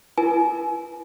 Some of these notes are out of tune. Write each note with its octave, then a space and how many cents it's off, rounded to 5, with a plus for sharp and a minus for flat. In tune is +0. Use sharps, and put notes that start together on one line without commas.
E4 +45 B4 -30 G#5 +35